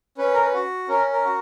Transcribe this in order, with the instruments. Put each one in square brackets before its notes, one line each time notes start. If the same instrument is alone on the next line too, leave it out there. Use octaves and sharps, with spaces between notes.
[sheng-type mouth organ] C#4 B4
A#4
B4
F#4
C#4 A#4
A#4
F#4